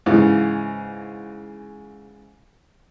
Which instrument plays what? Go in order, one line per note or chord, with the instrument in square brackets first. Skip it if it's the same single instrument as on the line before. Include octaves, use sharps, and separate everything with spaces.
[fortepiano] G#2 C#3 E3